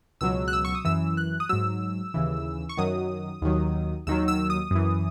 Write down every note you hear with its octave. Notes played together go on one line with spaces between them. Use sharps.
C#2 B2 F#3 E6
F#6
E6
C#6
D#6
F#2 E3 E6
F#6
D#6
G#2 F#3 E6
D#2 C#3 E3
C#6
F#2 D#3 F#3 D#6
D#2 D#3 F#3
D#2 D#3 F#3 E6
E6
D#6
F#2 E3